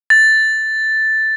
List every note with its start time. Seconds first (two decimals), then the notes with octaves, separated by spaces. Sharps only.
0.10 A6